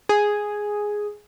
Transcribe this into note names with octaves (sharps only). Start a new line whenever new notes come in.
G#4